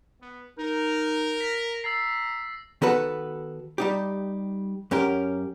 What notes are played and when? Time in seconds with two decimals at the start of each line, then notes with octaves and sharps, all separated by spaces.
0.21 B3
0.58 D#4 A#4
1.41 A#6 B6
1.84 A#5 E6 A6 C7
2.82 D#3 B3 F#4 A4 B4
3.78 G3 D#4 G4
4.91 F#2 C#4 G4 A#4